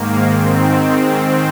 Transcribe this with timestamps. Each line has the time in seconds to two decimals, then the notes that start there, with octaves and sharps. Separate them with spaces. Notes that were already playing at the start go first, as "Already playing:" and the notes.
Already playing: G#2 D#3 A#3
0.32 G#2 D#3 C4
0.78 G#2 D#3